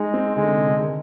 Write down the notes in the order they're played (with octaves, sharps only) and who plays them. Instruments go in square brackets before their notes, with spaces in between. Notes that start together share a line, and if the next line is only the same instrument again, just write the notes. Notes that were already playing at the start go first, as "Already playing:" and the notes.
Already playing: [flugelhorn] G#3 [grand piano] D#4
[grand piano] C4
[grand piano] D3 [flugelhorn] G#3
[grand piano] C3
C3
D3
D#3